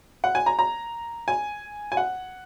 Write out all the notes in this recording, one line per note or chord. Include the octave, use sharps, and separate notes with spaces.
F#5
G#5
A#5
A#5
G#5
G#5
F#5